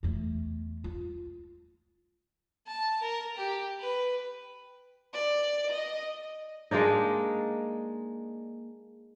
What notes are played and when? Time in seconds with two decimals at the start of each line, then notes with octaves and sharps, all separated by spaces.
0.03 E2 A3
0.84 F4
2.67 A5
3.02 A#4
3.37 G4
3.80 B4
5.14 D5
5.71 D#5
6.71 G#3 A#3 D4 D#4